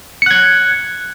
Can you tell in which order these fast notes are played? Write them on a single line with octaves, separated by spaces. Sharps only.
C#7 F#6 G#6